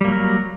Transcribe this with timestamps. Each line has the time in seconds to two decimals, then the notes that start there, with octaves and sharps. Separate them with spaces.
0.01 G3
0.04 A#3
0.08 F#3
0.12 A#4